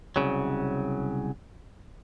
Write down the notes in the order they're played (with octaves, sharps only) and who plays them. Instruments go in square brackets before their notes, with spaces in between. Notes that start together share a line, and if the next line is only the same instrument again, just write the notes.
[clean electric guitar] C2 F#2 C#3 F#3